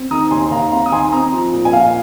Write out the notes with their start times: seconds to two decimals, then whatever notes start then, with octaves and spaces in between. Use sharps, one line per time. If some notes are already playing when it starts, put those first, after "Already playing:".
Already playing: C4
0.11 D#3 A#5 D#6
0.31 D#2 G#5 C6
0.51 D#2 F5 A#5
0.71 C4 F5 A#5
0.86 D#6
0.92 D#3 G#5 C6
1.12 C4 A#5 D#6
1.33 F3
1.53 A#2
1.65 G#5
1.73 A#2 F5